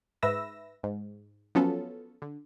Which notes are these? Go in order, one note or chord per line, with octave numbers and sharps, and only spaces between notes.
G#2 B4 E5 E6 A#6
G#2
F3 F#3 B3 C#4 F4 A4
D3